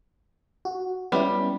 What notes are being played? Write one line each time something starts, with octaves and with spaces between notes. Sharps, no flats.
F#4
G3 B3 C#4 E4